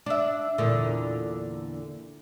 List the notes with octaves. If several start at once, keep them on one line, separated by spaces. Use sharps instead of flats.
D4 E5
E2 A#2 D3